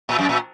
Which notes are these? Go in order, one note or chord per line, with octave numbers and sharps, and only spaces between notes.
A#2
F#2
A#2